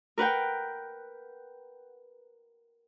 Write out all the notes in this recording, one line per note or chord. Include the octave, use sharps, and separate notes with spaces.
A#4 B4 F#5 G5